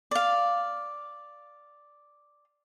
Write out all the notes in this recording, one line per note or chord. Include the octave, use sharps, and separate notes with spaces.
D5 F5